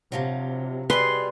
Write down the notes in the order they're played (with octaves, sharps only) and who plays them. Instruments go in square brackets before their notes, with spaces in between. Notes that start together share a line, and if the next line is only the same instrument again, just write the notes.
[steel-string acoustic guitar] G2 F3 F#3 [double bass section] C3
[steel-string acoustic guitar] B2 G3 G#4 [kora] B4 [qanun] C6